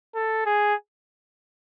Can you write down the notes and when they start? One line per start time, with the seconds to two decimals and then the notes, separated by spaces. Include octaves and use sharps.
0.14 A4
0.46 G#4